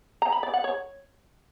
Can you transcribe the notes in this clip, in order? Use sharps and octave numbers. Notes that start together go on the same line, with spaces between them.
A#5
B5
D5
F#5
C#5